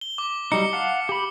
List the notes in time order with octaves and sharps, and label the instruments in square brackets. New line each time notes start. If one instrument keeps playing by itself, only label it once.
[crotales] G7
D6
[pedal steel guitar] F#3 G3 D#4 [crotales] C#7
[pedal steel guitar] F5 F#5 A5
G4 B5